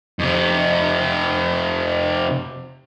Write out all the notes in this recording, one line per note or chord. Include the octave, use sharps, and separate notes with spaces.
F2 C3